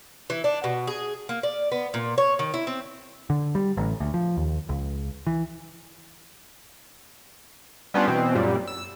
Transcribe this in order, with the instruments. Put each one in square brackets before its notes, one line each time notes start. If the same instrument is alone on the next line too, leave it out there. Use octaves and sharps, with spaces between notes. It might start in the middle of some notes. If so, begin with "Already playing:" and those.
[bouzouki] E3
D4
B2
G#4
A#3
D5
B3
A#2
C#5
D#3
E4
C4
[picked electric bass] D3
G3
A1
D2
F3
D#2
C#2
E3
[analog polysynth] G3 B3 C#4 D4 F4
B2 E3 C4
F#2 A#2 G3
E6